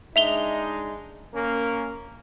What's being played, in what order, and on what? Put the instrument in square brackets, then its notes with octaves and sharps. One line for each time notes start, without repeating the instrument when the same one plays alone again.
[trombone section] G#3 D4 D#4 [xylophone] E5 F7 G7
[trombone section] A#3 C#4 A#4